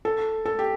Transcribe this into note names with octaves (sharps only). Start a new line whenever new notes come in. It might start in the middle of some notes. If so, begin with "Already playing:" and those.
A4
A4
G4